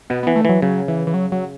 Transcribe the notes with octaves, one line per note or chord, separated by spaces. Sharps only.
B2 B3
B3
E3
A3
E3 F#3
C#3 F#3
E3
E3
F#3
F#3